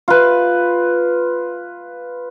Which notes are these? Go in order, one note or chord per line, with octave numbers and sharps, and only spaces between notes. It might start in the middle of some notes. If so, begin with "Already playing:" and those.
F4 B4